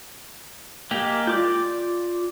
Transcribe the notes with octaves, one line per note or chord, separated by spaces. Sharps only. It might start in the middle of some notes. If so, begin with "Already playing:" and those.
G#3 A#3 G4
F4 D5 D6 G6